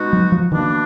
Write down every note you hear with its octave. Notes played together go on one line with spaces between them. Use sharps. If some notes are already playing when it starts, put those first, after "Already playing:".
Already playing: B2 G#3 D#4 F#4
F#3
F3
B2 D#3 A#3 D4